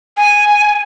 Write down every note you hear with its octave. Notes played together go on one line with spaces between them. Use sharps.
G#5